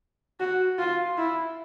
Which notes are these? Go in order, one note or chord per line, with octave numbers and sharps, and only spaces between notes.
F#4
F4
E4